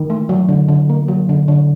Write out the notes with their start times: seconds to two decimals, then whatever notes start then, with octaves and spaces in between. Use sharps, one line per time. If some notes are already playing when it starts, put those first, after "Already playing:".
Already playing: D#3
0.10 A3
0.29 F#3
0.49 D3
0.68 D3
0.89 A#3
1.08 F#3
1.29 D3
1.48 D3